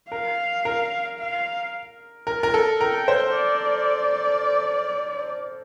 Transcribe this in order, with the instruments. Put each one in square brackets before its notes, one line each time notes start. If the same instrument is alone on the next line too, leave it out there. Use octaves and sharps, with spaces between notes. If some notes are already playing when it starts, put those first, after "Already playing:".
[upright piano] A#4 [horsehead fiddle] F5
[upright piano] A#4
[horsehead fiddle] F5
[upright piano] A#4
A#4
A4
[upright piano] A#4 [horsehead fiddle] G5
[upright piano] C5
[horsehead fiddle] D5